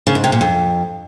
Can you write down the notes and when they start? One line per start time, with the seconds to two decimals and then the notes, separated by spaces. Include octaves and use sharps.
0.07 C#3
0.15 G#2
0.24 C3
0.32 A#2
0.41 F2